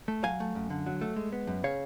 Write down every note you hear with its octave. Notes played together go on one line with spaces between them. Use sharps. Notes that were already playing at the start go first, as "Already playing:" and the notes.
A3
F#3 F5 G#5
A3
F#2
D3
F#3
A3
G#3
B3
F#2
C#3 C#5 F5